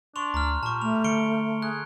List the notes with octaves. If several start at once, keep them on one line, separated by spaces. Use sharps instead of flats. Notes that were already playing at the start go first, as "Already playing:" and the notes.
D4 C6 C#6 F7
D2 A#5 F6
A#2 G3 A5 C#6
A3 F7
D3 C#7 D7 G7
G#4 F#6